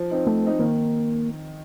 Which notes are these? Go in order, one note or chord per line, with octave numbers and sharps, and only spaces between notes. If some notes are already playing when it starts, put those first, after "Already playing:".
Already playing: F3
C4 D#4
F3 A3
C4 D#4
D#3 A#3